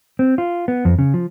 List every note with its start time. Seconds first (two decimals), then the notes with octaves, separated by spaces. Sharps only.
0.19 C4
0.38 F4
0.68 B3
0.85 F2
0.99 C#3
1.14 F3